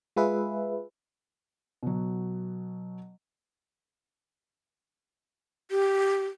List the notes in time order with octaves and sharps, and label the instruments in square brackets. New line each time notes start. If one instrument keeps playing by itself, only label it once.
[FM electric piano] G#3 F4 G#4 B4 E5
[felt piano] B2 F#3
[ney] G4